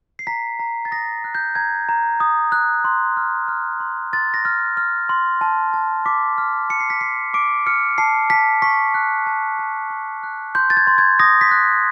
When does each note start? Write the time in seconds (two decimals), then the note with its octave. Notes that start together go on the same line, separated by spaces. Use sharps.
0.19 C7
0.27 A#5 B6
0.59 A#5
0.85 A6
0.91 D#6 A#6
1.24 F#6
1.35 G6
1.55 A#5 G#6
1.89 A#5
2.20 D#6
2.52 F#6
2.84 C6
3.17 F6
3.48 F6
3.80 C6
4.13 C6 A6
4.34 A#6
4.45 F6
4.77 F6
5.09 C6
5.41 A5
5.74 A5
6.06 D6 B6
6.38 F6
6.70 A5 C#7
6.80 C7
6.90 B6
7.01 A5 C7
7.34 D6 D7
7.66 F6 C#7
7.98 A5 C7
8.30 A5 B6
8.62 C#6 B6
8.94 F#6
9.26 A5
9.59 A5
9.90 C#6
10.23 F#6
10.55 C6 G6
10.70 A6
10.77 G#6
10.87 C6
10.98 G#6
11.19 D#6 A#6
11.41 B6
11.51 F#6